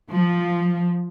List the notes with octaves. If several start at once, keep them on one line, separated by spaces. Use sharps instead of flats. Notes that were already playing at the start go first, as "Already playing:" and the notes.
F3